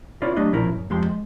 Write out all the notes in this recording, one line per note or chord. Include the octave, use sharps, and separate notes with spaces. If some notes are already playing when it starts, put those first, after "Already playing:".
C#4 E4 F4 B4 C#5 D5
F#3 G3 A3 D4 D#5
B1 A#2 F3 C#4 E4 A#4
F#2
F2 F3 G#3 G4 C6
G#3